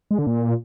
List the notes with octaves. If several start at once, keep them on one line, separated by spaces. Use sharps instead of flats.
G#3
D3
A#2